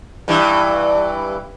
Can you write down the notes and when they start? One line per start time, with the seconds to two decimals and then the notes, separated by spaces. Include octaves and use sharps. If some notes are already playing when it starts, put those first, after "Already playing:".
0.28 G2 E3